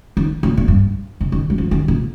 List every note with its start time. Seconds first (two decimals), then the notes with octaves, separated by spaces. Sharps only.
0.17 D#3
0.43 A#2
0.57 A#2
0.68 G2
1.20 C3
1.32 D#3
1.50 G3
1.58 F3
1.71 D#3
1.88 A#2